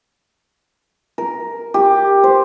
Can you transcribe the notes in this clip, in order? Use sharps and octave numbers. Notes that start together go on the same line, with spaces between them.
A#4
G4
C5